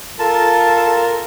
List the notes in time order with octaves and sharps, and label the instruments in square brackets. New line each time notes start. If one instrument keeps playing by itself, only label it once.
[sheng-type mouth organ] F4 A#4 [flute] A4 [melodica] A5